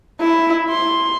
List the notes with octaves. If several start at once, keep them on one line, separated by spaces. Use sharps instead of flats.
E4
C6